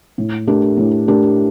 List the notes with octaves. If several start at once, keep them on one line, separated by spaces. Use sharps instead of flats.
A2
A3 D4 G4 A#4
A2
A3 D4 G4 A#4